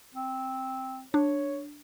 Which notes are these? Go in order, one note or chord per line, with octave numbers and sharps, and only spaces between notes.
C4
D4 C#5